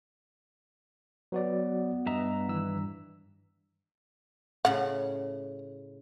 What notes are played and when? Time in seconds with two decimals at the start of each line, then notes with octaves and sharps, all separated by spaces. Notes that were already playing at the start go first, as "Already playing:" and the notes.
1.32 F#3 B3 F#4 D5
2.06 G2 D#5 E5 A#5
2.48 D#3 E3 E6
4.65 A2 C#3 F#5